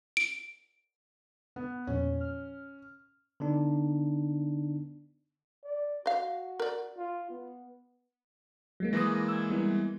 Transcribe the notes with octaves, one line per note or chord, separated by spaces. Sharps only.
D7
B3
E2 A#2 F3 C#4
F6
D3 B3 D4 D#4
D5
F#4 D#5 F5
A#4 D5
F4
B3
F#3 G#3 A#3
E3 G#3 A#3 D#6 A#6
E6 G#6
G3 B3 E4